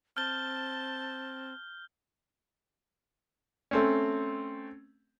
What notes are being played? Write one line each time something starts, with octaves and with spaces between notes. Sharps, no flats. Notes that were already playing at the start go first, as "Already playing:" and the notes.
C4 A5 F6 G6 G7
A3 C4 C#4